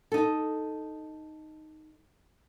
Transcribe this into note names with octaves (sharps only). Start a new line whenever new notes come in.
D#4 A4